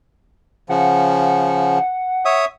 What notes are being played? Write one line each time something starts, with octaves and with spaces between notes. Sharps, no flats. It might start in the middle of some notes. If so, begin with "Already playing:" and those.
C#3 F3 F#5
C#5 E5 D#6